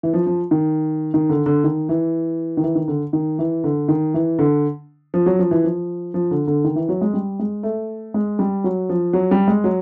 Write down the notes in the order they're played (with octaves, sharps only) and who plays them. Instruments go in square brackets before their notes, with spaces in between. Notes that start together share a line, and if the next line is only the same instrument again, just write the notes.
[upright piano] E3
F3
F3
D#3
D#3
D3
D3
D#3
E3
D#3
E3
D#3
D3
D#3
E3
D3
D#3
E3
D3
F3
F#3
F3
E3
F3
F3
D3
D3
D#3
E3
F#3
G#3
G3
G#3
A3
G#3
G3
F#3
F3
F#3
G3
G#3
F#3